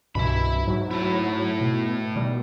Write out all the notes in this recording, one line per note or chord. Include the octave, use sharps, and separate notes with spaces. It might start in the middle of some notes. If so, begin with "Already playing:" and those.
C2 G2 B2 E3 E5 B5
G#2 F#3
A3 E4
B2
B2 D#3 G3